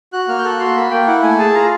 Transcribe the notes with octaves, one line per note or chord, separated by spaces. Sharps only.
F#4 F#6
A#3 F6
G6
A4 F#6
F#4 C6
A#3 B5
A#3 G5
E4 F#5
A3 G#5
G#4 A5
F4 A#5